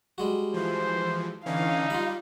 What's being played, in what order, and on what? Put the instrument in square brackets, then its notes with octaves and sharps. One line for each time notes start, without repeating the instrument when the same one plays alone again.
[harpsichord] G3 G#3 F#4
[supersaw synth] E3 F3 [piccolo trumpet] C5
[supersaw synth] D3 E3 C#4 [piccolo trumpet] D#4 [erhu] F5
[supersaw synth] G3 [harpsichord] F4 B5